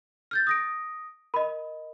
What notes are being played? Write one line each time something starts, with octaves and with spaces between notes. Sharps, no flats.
F6 G6 A6
D#6 A#6 D7
A#4 D#5 B5